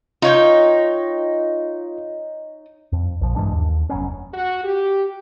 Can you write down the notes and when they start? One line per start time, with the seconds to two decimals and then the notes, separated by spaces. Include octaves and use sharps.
0.22 D#4 F4 C#5 G5
2.92 F2
3.21 A#1 F3
3.36 G2 E3 G#3 D4
3.53 D#2
3.90 F1 F#3 B3 C#4
4.34 F#4
4.64 G4